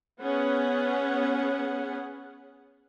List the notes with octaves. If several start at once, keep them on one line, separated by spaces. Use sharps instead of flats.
B3 C#4 G#4 F#5